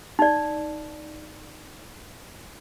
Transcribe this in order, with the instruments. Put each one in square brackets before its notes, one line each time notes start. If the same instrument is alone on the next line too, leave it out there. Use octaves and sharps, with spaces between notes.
[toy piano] D#4 D5